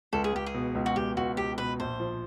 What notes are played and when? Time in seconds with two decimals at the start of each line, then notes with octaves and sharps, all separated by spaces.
0.13 C#2 A4
0.24 G#4
0.33 C#2 G4
0.46 G#4
0.54 B2
0.75 C#2
0.86 F#4
0.96 C#2 G4
1.17 C#2 F#4
1.37 C#2 G4
1.58 B2 B4
1.80 A#1 C5
2.00 F3